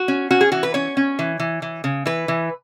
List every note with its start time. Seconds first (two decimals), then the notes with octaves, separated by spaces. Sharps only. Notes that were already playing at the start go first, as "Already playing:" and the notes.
Already playing: F#4
0.08 C#4
0.31 C#4 F#4
0.41 G#4
0.52 E3 F#4
0.63 B4
0.74 C#4 C#5
0.97 C#4
1.19 E3
1.39 E3
1.62 E3
1.84 C#3
2.06 E3 B4
2.28 E3